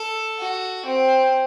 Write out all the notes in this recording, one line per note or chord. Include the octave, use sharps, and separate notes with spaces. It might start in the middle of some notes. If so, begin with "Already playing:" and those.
Already playing: A4
F#4
C4